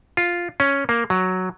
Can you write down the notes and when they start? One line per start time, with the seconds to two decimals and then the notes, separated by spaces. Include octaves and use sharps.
0.17 F4
0.60 C#4
0.89 A#3
1.10 F#3